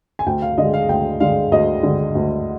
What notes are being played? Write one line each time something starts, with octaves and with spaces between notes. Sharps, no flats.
G#5
D2 G5
F5
D3 G#3 D#5
F5
D2 G5
D3 G#3 F5
D2 D#5
D3 G#3
D2